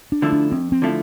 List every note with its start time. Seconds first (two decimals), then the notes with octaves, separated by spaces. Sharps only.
0.12 D4
0.22 D3 F3 A3 E4
0.32 D4
0.52 F2 C4
0.72 C4
0.82 D3 F3 A3 E4